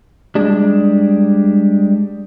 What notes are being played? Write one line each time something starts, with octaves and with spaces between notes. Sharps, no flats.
G3 G#3 D4